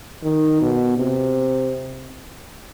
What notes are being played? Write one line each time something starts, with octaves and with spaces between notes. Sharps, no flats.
D#3
B2
C3